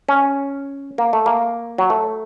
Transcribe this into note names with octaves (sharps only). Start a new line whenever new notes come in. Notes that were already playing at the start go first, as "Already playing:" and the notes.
C#4
A#3
A3
A#3
F#3
A3